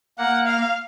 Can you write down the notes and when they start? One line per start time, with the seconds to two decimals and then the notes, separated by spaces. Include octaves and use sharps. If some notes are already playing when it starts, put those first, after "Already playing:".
0.18 A#3 F#5
0.47 F5